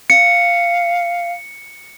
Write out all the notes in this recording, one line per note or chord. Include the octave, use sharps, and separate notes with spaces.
F5 C#7